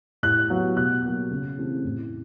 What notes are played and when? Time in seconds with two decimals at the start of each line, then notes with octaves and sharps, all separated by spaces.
0.23 A2 F#6
0.50 F#3 B3
0.76 B2 F#6
1.04 F#3 A#3
1.31 C#3
1.57 E3 A3 C4
1.85 A2